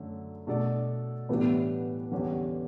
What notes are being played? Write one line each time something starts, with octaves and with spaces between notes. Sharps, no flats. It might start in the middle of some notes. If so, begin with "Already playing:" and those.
Already playing: F#2 D3 A3
B2 A3 D4 A4 D5
A2 E3 G3 B3 D4
E2 D3 G3 C#4 G4